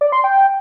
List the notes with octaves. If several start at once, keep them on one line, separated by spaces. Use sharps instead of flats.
D5
C6
G5